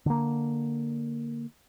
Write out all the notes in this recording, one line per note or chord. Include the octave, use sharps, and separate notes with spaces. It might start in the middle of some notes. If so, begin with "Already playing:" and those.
D3 A#3